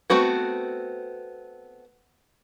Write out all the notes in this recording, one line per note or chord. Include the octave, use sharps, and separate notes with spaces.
A3 B3 C4 F#4 B4